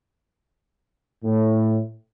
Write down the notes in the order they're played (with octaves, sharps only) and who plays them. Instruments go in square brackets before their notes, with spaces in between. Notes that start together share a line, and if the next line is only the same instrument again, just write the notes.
[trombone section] A2